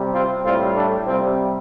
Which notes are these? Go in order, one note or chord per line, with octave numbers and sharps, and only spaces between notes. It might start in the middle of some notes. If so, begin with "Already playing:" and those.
Already playing: C3 G3
C4 F4
A2 G3 C4 F4
A3 D4
C3 G3 C4 F4